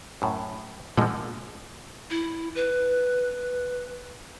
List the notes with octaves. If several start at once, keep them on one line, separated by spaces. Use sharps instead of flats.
F#2 A2
A#2 D3 F3 G#3
E4
B4